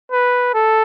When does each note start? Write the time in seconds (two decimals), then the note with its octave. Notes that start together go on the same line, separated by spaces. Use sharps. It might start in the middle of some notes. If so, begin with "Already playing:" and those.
0.12 B4
0.54 A4